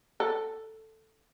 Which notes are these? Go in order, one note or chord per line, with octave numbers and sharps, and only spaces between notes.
A4